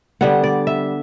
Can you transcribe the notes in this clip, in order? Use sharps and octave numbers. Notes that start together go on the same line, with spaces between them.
D3 G3 B3 F#5
D5
E5